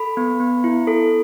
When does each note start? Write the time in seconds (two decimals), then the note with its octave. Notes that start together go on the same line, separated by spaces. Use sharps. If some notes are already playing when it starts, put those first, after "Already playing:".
Already playing: A4 B5
0.17 B3
0.40 B3
0.64 E4
0.87 A4